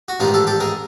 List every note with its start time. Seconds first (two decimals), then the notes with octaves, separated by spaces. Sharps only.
0.08 F#4
0.20 A1 G#2 D#3 F4 G4
0.34 G4 A4
0.47 G4 A4
0.60 G#4 A#4